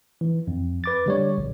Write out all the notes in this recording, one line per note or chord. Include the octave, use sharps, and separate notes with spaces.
E3
F2
B4 D6 A6
D3 G3 C#5
A#1